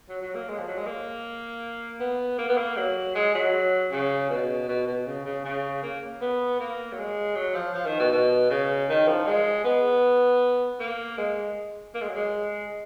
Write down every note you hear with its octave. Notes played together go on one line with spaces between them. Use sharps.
F#3
F#3
A#3
G#3
F3
F#3
G#3
A#3
B3
A#3
B3
A#3
F#3
G#3
F#3
C#3
B2
B2
B2
C#3
C#3
C#3
A#3
B3
A#3
F#3
G#3
F#3
F3
F3
D#3
B2
B2
C#3
D#3
F3
G#3
B3
A#3
G#3
A#3
G#3
F#3
G#3